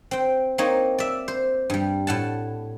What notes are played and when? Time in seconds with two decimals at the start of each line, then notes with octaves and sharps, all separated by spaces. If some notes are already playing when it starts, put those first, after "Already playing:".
0.11 C4 G5
0.58 A#3 C4 D#4 C#5
0.98 D5 E5
1.28 C5
1.70 G2 G3
2.07 A2 F#5 A5